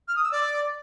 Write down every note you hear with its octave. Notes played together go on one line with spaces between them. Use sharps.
F6
D#6
E6
D5